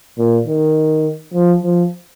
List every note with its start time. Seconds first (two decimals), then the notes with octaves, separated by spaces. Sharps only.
0.18 A#2
0.46 D#3
1.33 F3
1.63 F3